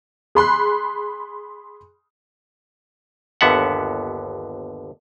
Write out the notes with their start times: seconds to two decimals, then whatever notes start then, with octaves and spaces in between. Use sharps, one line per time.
0.35 G#4 B5 C6 F#6
3.41 G1 D#2 D3 B3 E5 F#5